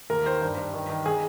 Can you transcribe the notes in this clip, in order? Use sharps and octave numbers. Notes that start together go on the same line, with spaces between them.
D#2 A#4
D#3 C5
G2
G2
D#3
D#3
G#4